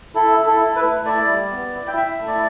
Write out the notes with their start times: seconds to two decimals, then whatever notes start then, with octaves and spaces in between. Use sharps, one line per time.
0.15 E4 A4
0.37 E4
0.46 A4
0.61 E4
0.76 B4
0.83 A3
1.06 E4 D5
1.29 G3
1.51 B3
1.74 E4
1.87 G5
1.97 E4 E5
2.20 A3
2.27 D5